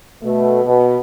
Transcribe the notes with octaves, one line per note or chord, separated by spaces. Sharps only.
B2 A3
B2